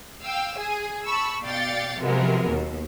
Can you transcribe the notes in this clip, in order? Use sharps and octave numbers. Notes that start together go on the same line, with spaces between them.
F5 G5 E6
G#4 G#5
A5 B5 C#6 E6
B2 D5 F5 G5 A6 C#7
C3 F3 F#3 G#3 B3 A#4
D#2 B2